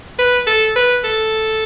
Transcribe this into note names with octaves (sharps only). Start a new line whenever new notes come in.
B4
A4
B4
A4